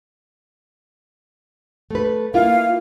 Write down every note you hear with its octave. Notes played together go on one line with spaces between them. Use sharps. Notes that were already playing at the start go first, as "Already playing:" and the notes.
A3 B4
A#3 E4 F4 F5